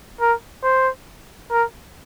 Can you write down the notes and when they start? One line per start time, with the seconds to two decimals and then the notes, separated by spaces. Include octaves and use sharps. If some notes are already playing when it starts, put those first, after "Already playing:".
0.21 A#4
0.63 C5
1.51 A#4